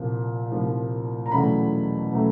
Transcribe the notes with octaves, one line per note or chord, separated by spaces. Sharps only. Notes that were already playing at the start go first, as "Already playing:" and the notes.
Already playing: C2 A#2 F3
C2 A#2 F3
A#5
E2 B2 F#3 A3 C#4 B5
B2 F#3 A3 C#4